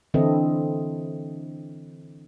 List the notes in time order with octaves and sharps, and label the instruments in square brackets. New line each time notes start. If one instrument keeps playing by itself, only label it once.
[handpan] D3 E3 C4 E4 A4 D#5